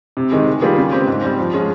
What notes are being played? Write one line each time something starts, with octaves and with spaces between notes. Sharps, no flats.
C3
D#3 G#3 D#4 G#4
D#3
G3 A#3 F4 G#4
C#3
G#3 C4 G4
G#2
G3 C4
F3
G#3 C#4 F4 G#4